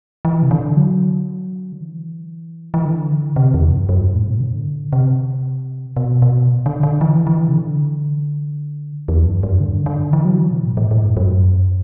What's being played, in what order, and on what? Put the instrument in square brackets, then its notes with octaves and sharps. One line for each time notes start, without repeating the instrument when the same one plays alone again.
[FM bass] E3
C3
D3
F#3
D3
E3
E3
D3
C3
E2
F#2
F#2
G2
A2
B2
D3
C3
B2
B2
D3
D3
E3
E3
C3
D3
E2
F#2
G2
D3
D3
E3
F#3
E3
B2
A2
A2
A2
G2
F#2